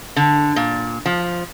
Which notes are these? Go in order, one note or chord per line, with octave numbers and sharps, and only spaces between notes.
D3
A#2
F3